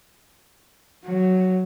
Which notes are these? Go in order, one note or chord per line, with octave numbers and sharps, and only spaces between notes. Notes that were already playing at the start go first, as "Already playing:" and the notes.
F#3